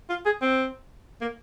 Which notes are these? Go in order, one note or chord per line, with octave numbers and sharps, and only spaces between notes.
F4
G#4
C4
A#3